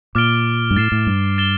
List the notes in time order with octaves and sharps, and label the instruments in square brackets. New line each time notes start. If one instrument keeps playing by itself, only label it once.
[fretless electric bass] A#2 [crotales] D6 F6 A6 D7 G7
[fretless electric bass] G2
[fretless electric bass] A2 [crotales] A6 C7 E7
[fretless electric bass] A2
G2
[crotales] A6 E7 G7